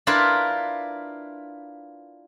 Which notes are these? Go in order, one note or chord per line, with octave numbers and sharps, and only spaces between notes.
D4 E4 F4 A#4 B4